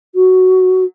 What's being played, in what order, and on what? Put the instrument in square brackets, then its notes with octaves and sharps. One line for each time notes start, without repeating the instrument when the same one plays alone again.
[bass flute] F#4